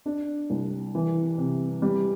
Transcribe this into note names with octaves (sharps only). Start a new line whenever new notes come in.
D4
C2
E3
C3
G3